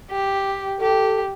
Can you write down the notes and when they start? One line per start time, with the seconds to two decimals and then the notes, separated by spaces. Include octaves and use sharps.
0.11 G4
0.81 G4 A4